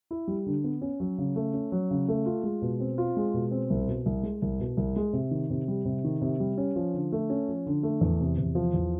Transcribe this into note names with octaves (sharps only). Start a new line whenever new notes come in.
E4
G3
D3
B3
C#4
F#3
C#3
A3
C#4
F#3
C#3
A3
F4
G#3
B2
C4
F4
G#3
B2
C4
C2
B2
C2
G#3
C2
B2
C2
G#3
C3
D#3
C3
G3
C3
D#3
C3
G3
C#4
F3
D3
A3
C#4
F3
D3
A3
E2
C3
E2
F3
E2